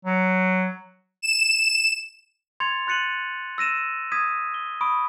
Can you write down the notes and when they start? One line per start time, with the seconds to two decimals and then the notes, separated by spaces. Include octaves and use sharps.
0.05 F#3
1.22 E7
2.60 C6 G#6 A6 C#7 F7
2.87 C6 F#6 A6 C#7 D#7 F#7
3.58 E6 A#6 D#7 E7
4.12 D#6 G#6 B6 D#7
4.54 G7
4.81 B5 C#6 D#6 D7